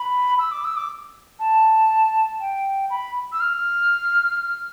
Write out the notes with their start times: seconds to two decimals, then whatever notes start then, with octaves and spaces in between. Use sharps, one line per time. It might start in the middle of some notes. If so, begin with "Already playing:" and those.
Already playing: B5
0.39 E6
0.51 D6
0.64 E6
0.76 D6
1.39 A5
2.40 G5
2.90 B5
3.32 E6
3.40 F6